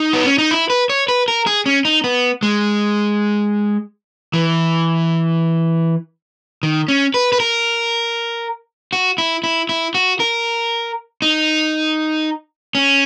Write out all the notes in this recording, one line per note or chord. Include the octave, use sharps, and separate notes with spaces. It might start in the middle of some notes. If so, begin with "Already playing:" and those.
Already playing: D#4
B3
C#4
D#4
E4
B4
C#5
B4
A#4
G#4
C#4
D#4
B3
G#3
E3
D#3
C#4
B4
B4
A#4
F#4
E4
E4
E4
F#4
A#4
D#4
C#4